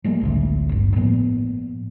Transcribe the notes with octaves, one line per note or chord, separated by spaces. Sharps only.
F3 G3 G#3 A#3
A1 D2 C#3
G#1 G2
A2 F3 A#3 B3